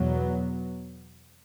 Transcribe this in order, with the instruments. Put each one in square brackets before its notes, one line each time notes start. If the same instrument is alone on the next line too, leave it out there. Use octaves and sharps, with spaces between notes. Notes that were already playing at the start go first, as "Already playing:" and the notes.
Already playing: [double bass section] E2 B2 F#3 B3